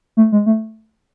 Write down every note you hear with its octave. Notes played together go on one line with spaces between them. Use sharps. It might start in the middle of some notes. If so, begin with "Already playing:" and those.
A3
G#3
A3